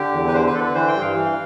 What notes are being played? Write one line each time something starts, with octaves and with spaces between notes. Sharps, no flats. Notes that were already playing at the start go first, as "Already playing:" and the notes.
Already playing: D3 G4
E2
B4
D3 C5
B4
D3 A4
B4
E3 C5
G5
G2
F5
E3